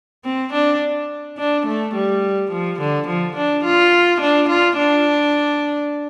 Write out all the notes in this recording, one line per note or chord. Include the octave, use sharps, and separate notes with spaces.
C4
D4
D4
A3
G3
F3
D3
F3
D4
F4
D4
F4
D4